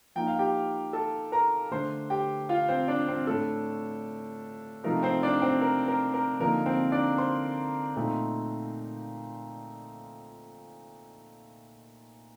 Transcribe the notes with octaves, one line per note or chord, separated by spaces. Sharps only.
F3 A#3 D#4 G5
F5
G4 G5
A4 A5
A#4 A#5
D3 A3 D4 C5 C6
G4 G5
F4 F5
C4 C5
D4 D5
C4 C5
A2 A3 D4 A4
C3 F3 A3 D#4 A#4
C4 C5
D4 D5
C4 C5
A#4
A#4
A#4
D3 F3 A#3 D#4 A#4
C4 C5
D4 D5
C5 C6
A#2 A3 C4 D#4